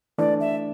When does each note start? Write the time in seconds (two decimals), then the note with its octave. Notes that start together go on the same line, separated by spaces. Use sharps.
0.18 E3 A3 D4 D5
0.40 E5